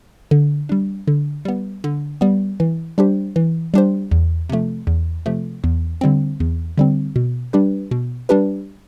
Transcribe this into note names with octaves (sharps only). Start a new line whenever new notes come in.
D3
G3 D4
D3
G3 B3
D3
G3 B3
E3
G3 D4 G4 C5
E3
G3 D4 G4 C5
E2
C3 F3 A3
E2
C3 F3 A3
E2
D3 G3 C4
E2
D3 G3 C4
B2
G3 D4 G4 B4
B2
G3 D4 G4 B4